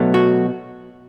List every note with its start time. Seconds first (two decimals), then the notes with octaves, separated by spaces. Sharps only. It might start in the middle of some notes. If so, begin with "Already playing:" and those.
Already playing: B2 F#3 A3
0.14 F#4